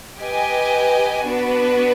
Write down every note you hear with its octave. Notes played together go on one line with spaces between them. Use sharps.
G4 B4 D#5 G#5
B3 D4 F#4 B4